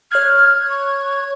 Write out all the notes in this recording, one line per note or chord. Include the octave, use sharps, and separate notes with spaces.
C#5 F6 F#6 G#6
C#6